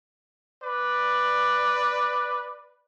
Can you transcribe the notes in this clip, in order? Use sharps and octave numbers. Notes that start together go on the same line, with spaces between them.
B4 D5